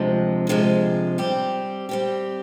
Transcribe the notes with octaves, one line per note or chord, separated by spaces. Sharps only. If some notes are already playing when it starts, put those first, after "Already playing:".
Already playing: D2 C3 F3 G#3
D2 C3 F3 G#3
G3 C4 G4
G3 C4 G4